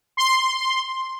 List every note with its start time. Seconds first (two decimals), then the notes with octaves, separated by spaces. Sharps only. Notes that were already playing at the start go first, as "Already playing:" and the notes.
0.17 C6